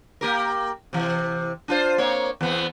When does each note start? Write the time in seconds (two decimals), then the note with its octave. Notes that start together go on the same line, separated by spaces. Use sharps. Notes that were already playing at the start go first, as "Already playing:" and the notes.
0.21 A#3 G4 A#4
0.93 C3 E3
1.68 D4 F4 C5
1.98 A#3 C4 C#5
2.41 E2 B3 C4